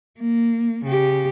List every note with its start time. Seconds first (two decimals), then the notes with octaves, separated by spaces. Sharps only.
0.20 A#3
0.85 C#3 G4